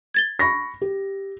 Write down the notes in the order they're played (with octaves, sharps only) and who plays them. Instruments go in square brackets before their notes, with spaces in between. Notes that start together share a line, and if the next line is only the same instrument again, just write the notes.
[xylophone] G#6 A6 G7
[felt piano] B5 C#6 A#6
G4